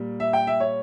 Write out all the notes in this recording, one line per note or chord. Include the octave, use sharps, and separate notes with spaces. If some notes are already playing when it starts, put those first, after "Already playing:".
Already playing: A#2 G3
E5
G5
E5
C#5